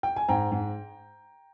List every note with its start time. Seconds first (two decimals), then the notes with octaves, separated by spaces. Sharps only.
0.03 G5
0.16 G#5
0.28 G#2 G5 A#5
0.52 G#2